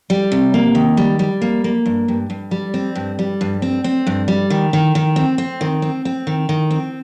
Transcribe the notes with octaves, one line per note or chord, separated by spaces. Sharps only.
G3
C3
A#3
D#3
G3
G3
A#3
A#3
G2
G2
G2
G3
C4
G2
G3
G2
C4
C4
G2
G3
D#3
D#3
D#3
C4
C4
D#3
C4
C4
D#3
D#3
C4